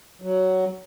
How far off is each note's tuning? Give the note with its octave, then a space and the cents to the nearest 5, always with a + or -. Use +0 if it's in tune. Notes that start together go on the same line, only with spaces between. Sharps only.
F#3 +10